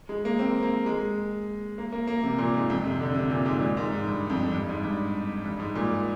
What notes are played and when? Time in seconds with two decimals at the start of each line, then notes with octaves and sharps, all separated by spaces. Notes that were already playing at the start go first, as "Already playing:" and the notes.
0.09 G#3
0.25 A#3
0.39 C4
0.62 A#3
0.86 G#3
1.78 A#3
1.92 A#3
2.07 A#3
2.24 C3
2.38 A#2
2.54 G#2
2.70 F2
2.85 C3
3.00 D3
3.15 C3
3.30 A#2
3.46 G#2
3.61 A#2
3.77 G#2
3.92 G#2
4.07 G2
4.30 F2
4.53 G2
4.69 G#2
4.83 G2
5.44 G2
5.59 G#2
5.75 A#2